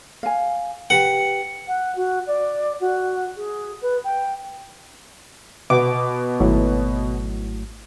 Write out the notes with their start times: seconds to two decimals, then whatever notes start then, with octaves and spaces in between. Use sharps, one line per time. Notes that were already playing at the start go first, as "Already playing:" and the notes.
0.23 F5 G#5
0.90 G4 B4 F#5
1.67 F#5
1.95 F#4
2.26 D5
2.80 F#4
3.37 G#4
3.81 B4
4.04 G5
5.70 B2 B3 D6
6.40 G#1 A2 F#3